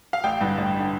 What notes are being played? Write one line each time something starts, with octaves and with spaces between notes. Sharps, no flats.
F5
A1 G5
G2 D3
A1
D3